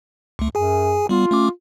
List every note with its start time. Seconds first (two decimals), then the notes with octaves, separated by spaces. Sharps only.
0.39 C#2 A3
0.55 F#2 G#4 G#5
1.09 G3 B3 F4
1.31 A3 C#4 D6